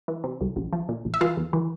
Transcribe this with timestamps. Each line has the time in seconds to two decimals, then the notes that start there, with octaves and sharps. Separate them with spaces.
0.08 E3
0.24 C3
0.41 C2
0.56 A#1
0.73 F3
0.89 A#2
1.05 A#1
1.14 E5
1.21 E3 F4 F5
1.37 E2
1.53 E3